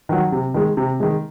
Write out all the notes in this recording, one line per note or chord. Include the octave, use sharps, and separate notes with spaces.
D#3 F#3
C3
D#3 G#3
C3
D#3 G#3